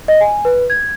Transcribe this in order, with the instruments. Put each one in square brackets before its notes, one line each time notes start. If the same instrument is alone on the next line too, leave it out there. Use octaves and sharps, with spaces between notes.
[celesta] D#5
G#5
B4
G#6